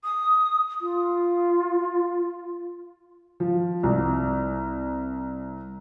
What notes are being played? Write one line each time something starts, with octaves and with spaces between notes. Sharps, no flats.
D#6
F4
F3
C2